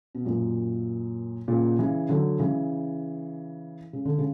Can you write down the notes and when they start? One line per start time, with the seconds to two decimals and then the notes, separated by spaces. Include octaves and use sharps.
0.15 B2
0.25 F#2 A#2
1.48 A#2 C#3
1.79 C#3 E3
2.09 D3 F#3
2.39 C#3 E3
3.93 C#3
4.05 D3
4.18 C#3